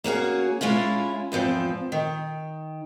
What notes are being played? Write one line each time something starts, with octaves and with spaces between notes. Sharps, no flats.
A#3 C#4 F#4 G#4
G#3 C#4 E4 F4
E2 G#2 F3 C4
D#3